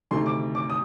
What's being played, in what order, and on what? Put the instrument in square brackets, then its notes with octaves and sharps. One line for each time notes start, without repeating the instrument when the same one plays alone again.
[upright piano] D2 C3 D#3 C6
D6
D6
D#6